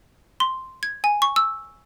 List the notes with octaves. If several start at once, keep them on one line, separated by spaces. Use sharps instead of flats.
C6
G#6
G#5
C#6
E6